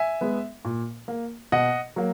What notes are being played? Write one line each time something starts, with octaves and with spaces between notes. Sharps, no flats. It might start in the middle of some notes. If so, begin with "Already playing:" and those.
Already playing: E5 G#5
G#3 B3
A#2
A#3
B2 D#5 F#5
F#3 A#3